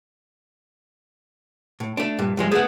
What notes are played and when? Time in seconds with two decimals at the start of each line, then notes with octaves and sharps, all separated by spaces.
1.80 A2
1.97 A3 D4
2.19 G2 A#2
2.37 G2 F3 G#3
2.52 A3 B3 G#4 F#5